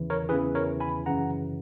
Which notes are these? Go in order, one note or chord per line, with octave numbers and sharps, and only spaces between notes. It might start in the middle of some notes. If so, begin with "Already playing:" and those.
Already playing: E2 C#3 E3
A#4 C#5
E2 C#3 E3 G#4 B4
A#4 C#5
G#5 B5
F#2 C#3 E3 F#5 A#5